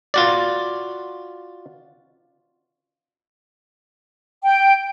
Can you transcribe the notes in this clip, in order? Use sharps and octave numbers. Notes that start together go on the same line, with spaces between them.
F4 F#4 D5
G5